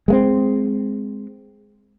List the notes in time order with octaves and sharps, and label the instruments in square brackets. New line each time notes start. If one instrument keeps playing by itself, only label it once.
[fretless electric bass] G#3 A3 C4